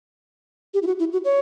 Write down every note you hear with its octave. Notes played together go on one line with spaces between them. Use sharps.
G4
E4
F#4
E4
F#4
C#5